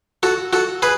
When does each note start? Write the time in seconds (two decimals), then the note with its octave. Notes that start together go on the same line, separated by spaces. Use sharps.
0.23 F#4 A4
0.53 F#4 A4
0.82 G#4 B4